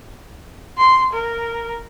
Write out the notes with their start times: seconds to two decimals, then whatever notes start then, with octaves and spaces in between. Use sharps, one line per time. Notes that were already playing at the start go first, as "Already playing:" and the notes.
0.77 C6
1.13 A#4